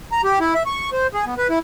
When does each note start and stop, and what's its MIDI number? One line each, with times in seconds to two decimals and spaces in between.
0.12 0.21 82
0.24 0.39 67
0.40 0.54 64
0.54 0.63 76
0.66 0.90 85
0.92 1.07 72
1.14 1.25 68
1.26 1.35 59
1.38 1.47 71
1.50 1.59 64